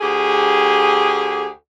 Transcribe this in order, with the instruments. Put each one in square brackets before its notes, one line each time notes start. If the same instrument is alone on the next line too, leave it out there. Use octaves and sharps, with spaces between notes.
[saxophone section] D2 G4 G#4